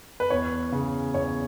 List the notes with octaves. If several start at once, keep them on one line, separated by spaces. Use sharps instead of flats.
B4
E2 C#5
C#3
E2 C#5